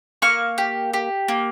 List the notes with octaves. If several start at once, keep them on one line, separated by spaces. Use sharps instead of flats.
A#3 C#6 F6
G4
G4
A#3